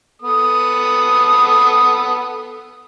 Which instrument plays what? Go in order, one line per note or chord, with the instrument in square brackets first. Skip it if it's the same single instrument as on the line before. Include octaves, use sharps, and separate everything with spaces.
[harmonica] B3 A4 D#6